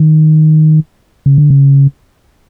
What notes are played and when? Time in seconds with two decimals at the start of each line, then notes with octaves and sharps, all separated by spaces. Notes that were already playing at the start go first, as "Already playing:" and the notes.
Already playing: D#3
1.26 C#3
1.38 D3
1.50 C#3